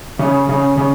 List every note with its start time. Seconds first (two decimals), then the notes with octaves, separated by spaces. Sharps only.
0.19 C#3
0.49 C#3
0.77 C#3